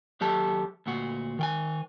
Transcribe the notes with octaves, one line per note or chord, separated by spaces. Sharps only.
D#2 F#3 G4 A4 A5
D2 A#2 F#4
D#3 G5 G#5